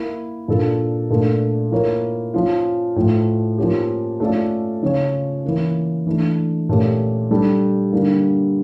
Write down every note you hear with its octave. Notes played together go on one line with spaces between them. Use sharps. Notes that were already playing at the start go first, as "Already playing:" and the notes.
Already playing: A#3 E4 A#4
A#2 F3 A#3 D4 A4
A#2 A3 D4 A4
F3 A#3 E4 A#4 C#5
F3 C#4 F4
A2 F3 A3
F3 A#3 C#4 G4
A3 C#4 F4 A4 D5
C#3 F3 C#4 F4 C#5
E3 A#3 C#4
E3 A3 D4
A#2 A3 C#4 G4
G3 D4 A4
D3 G3 A#3